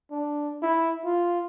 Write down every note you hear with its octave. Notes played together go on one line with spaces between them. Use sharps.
D4
E4
F4